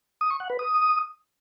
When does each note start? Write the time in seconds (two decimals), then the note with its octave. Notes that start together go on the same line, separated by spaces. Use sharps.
0.21 D#6
0.30 C#6
0.40 F#5
0.50 B4
0.59 D#6